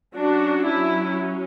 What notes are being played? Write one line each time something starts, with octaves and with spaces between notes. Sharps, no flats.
F#3 C#4 D4 F#4
E4